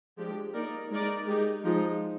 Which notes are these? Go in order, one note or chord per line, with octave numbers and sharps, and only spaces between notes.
F3 G#3 D4 G4
A#3 D#4 A#4 D5
G#3 D#4 A#4 D5
G#3 D#4 G4
F3 G#3 D#4